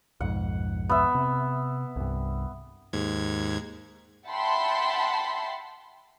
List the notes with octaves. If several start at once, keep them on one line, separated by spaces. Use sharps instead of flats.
B1 F2 G#2 F#5
B3 E5
C3
C2 G2
D#2 G#2 G#6
E5 F#5 G5 A5 B5 C6